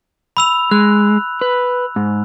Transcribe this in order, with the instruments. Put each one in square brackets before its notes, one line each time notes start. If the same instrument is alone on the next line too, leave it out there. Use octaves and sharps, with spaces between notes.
[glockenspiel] B5 E6 F7
[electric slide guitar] G#3 [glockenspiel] F#6
[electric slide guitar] B4
G#2